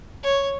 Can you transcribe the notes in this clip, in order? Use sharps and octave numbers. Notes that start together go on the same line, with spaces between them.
C#5